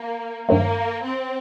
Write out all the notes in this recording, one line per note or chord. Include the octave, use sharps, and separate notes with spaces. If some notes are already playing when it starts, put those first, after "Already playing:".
Already playing: A#3
G2 D#3 F#3 A3 A#3
C4